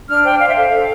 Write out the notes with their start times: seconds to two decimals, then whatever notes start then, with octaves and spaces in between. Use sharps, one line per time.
0.08 D4 F6
0.24 C5 G5
0.40 C5 F5
0.49 E5
0.56 A4 F5
0.72 A4